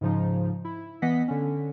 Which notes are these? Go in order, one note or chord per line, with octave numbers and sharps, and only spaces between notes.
G#2 C#3 F3 D#4
E4
E3 B3 D#5 F#5 B6
D3 C#4